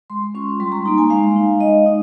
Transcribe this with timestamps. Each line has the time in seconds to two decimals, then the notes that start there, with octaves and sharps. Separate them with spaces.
0.10 G#3 C6
0.35 C#4 F4 C#6
0.60 G3 C6
0.72 A#5
0.85 A#3 D#4 A#5
0.98 G#5
1.10 G#3 F5
1.36 D#4
1.60 G#3 D#5
1.86 D#4